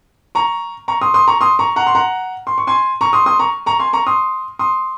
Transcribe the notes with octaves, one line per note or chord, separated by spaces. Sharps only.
A#5 C#6
A#5 C#6
C6 D#6
C6 D#6
A#5 C#6
C6 D#6
A#5 C#6
F#5 A#5
C6
F#5 A#5
C6
C#6
G#5 C6
A#5 C#6
C6 D#6
C6 D#6
A#5 C#6
A#5 C#6
G#5 C6
A#5 C#6
C6 D#6
C6 D#6